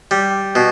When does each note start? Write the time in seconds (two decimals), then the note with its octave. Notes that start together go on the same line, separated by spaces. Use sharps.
0.11 G3
0.55 B2